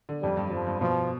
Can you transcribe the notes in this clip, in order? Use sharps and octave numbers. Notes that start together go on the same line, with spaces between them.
D3
F2 G3
G2
G2 F3
G2
B2 F3